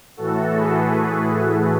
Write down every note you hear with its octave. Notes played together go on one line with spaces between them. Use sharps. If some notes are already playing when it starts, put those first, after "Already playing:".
A2 E3 A3 F#4 A4
G#4 B4